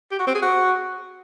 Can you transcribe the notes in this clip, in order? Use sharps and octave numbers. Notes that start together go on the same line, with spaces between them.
G4
F#4
C4
G#4
F#4